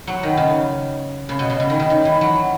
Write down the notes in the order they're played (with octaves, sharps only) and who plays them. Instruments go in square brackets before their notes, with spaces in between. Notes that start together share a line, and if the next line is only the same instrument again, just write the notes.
[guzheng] F#3
D#3
C#3
C#3
B2
C#3
C#3
D#3
C#3
D#3
E3
F#3